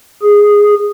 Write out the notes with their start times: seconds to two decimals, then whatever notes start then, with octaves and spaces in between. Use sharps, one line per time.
0.23 G#4